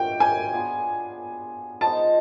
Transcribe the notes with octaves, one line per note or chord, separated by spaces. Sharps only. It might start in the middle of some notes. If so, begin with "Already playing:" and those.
Already playing: F3 G#3 C#4 F#4 G5
G#5
B3 D4 F4 G#4
F3 G#3 B3 D#4 A5